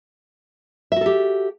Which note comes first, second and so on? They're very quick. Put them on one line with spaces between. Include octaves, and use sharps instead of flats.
E5 F#4 A4 G4